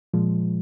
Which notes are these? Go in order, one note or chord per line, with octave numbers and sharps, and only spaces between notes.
A#2 F3 G#3